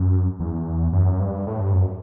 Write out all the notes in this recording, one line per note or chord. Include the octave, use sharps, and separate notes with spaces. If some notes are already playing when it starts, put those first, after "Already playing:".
Already playing: F#2
E2
F#2
G2
A2
G2
F#2